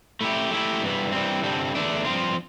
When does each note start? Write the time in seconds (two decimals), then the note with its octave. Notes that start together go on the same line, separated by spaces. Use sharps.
0.21 A3 E4 G4
0.51 A3 E4 G4
0.83 G2 E3 B3
1.12 G2 E3 G3 C4
1.43 G2 D3 G3 C4
1.75 E2 D3 A3 D4
2.05 G2 F3 C4 F4